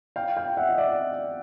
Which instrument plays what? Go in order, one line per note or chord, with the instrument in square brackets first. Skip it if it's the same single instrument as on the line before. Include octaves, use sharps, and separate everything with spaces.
[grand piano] F5 G5
F5 G5
E5 F#5
D#5
D5 E5